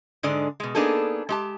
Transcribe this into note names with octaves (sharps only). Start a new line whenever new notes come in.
G#2 D3 G#3 D5
B2 G#3
A#3 B3 D4 D#4 G#4 A4
G#3 G4 A5